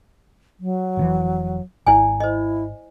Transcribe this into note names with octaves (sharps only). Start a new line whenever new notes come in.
F#3
F1 C3 E3
G#1 E4 D5 G#5
E4 C5 D#5